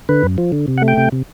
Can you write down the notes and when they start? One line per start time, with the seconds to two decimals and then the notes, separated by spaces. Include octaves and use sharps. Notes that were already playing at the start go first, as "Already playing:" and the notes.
0.09 D3 B4
0.23 F#2
0.38 F3
0.52 D3
0.68 C3
0.78 F#5
0.82 A3
0.88 G5
0.97 C3
1.12 C3